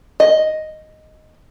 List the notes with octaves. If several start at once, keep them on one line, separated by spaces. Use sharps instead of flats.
D#5